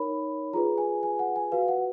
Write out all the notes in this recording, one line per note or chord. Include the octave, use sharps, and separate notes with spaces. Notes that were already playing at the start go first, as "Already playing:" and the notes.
Already playing: D#4 A#4 C#5 B5
F4 G#4 B4 A#5
G#5
G#5
F#5
G#5
F#4 B4 F5
F#5